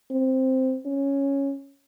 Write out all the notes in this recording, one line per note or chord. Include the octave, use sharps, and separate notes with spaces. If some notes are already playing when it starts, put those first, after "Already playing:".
C4
C#4